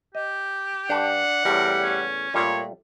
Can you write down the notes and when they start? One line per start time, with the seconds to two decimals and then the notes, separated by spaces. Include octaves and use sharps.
0.15 G4 D#5
0.90 G2 D4 F#5 A5
1.45 E2 A2 G3 A#4
1.83 C#4
2.34 A#2 G3 A3 F4 C#5